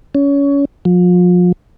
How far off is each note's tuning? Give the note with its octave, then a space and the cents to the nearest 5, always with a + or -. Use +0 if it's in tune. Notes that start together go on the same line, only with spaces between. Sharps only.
C#4 +25
F3 +35